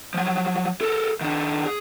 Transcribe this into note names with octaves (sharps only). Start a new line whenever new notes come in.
F3 F#3
A4 A#4
D#3 D4
G#4